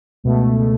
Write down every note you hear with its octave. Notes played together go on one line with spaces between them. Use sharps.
C#2 B2 A3